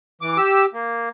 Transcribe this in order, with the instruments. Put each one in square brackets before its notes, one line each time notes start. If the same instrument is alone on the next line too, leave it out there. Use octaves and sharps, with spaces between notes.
[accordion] E3 D6
G4 E6
A#3